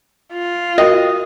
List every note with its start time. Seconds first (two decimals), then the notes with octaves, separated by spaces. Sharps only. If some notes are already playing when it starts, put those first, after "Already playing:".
0.33 F4
0.78 F#4 A#4 D#5 G5